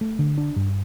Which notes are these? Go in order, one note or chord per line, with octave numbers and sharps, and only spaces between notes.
A3
D3
D4
G2